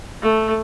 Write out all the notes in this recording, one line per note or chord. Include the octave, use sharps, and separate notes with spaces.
A3